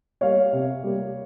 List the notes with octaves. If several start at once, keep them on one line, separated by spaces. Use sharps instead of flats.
G3 A#3 C#5 F5
C3
G3 A#3